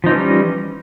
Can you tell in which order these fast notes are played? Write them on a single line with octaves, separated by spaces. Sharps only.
F3 D#4 E3 C#4 G3